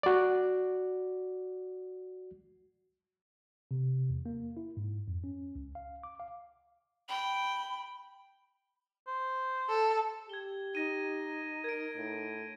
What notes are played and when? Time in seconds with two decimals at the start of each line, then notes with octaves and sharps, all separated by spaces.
0.03 F#4 D5
3.71 C3
4.10 E2
4.26 A#3
4.57 E4
4.77 G#2
5.08 F2
5.24 C#4
5.55 C#2
5.75 F5
6.03 D6
6.20 F5
7.09 G5 B5
9.07 C5
9.69 A4
10.29 G4 G#6 G7
10.75 D#4 A#6 D#7
11.64 A#4 G#6 D7
11.96 A2